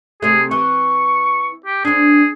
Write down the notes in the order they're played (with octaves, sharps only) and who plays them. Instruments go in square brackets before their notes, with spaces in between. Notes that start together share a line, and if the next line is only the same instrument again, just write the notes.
[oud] C3 A3 [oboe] G#4
[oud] E3 [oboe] C#6
[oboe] G4
[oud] C4 D4 [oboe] G#4